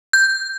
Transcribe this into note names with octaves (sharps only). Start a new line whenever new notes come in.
G6